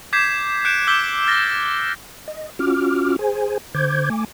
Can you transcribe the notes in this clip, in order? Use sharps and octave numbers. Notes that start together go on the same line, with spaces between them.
D6 G6 G#6 B6 C7 E7
F#6 G6 C#7 D7 E7
D6 E6 G6 B6 G7
F6 A6 A#6
D#5
C#4 F4 F#4 D6 F6
G#4 C5 G#5
D3 C5 D6 G6 G#6
A3 G#5 D6